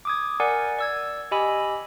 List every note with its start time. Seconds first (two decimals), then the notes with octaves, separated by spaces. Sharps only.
0.05 D6 D#6 G#6
0.40 A#4 D5 F#5 G#5
0.79 D5 E6 G#6
1.31 G4 D#5 G#5 B5 E6